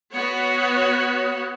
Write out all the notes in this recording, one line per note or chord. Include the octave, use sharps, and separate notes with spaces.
B3 F#4 C#5